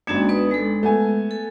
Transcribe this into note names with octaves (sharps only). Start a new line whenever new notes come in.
G#1 A#3 C#4 D4 F#4 G#6
B3 B4 D#6
G#3 A4
A3 B3 G#5
A4